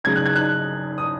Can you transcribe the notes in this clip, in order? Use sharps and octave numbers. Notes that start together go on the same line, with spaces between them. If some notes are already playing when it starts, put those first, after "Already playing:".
C#3 F#3 G#6
F#6
G#6
F#6
D#6